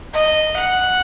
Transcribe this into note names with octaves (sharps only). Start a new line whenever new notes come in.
D#5
F#5